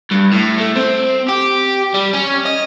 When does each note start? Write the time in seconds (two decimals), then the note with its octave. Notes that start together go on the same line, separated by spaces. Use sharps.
0.11 G2
0.32 A2
0.58 A3
0.76 C4
1.28 G4
1.94 G3
2.13 C#4
2.46 D#5